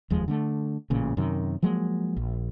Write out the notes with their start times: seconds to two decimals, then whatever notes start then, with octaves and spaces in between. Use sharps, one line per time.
0.10 F1 D#2 F3 G#3
0.28 D3 G#3 A3
0.90 A1 A#2 C#3
1.17 F#2 C3 D#3
1.62 F3 F#3 G#3 A#3
2.17 A#1